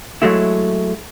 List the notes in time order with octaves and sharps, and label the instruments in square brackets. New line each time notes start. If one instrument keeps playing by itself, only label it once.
[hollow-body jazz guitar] F#3 G#3 A3 E4